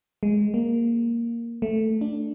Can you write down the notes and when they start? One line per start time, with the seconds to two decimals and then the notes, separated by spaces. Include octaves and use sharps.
0.23 G#3
0.54 A#3
1.62 A3
2.01 D4